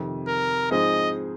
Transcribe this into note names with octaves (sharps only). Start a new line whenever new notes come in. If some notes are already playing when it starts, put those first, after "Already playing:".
Already playing: F2 C3 D#3
A#4
G#2 F3 C4 G#4 C5 D#5